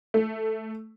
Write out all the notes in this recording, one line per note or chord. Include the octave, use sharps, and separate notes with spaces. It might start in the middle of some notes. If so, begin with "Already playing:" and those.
A3